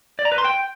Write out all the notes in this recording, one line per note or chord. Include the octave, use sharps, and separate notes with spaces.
D5
A#5
B4
C6
G5